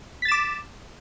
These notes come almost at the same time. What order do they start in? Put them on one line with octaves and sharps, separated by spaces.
B6 A6 E7 D6